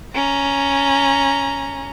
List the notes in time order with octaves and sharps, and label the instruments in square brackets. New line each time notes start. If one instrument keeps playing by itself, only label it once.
[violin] C#4 A#5